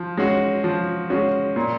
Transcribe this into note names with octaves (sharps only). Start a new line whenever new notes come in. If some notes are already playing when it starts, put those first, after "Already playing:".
Already playing: F3
G#3 C#4 F#4
F3
G#3 C#4 F#4
A#2